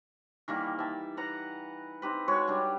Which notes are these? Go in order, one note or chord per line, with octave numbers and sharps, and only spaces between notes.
D#3 E3 G3 A#3
E5 A5
B4 F#5 A#5
C4 D#4 G4 B4
G#3 F#4 C#5
G3 D4 G4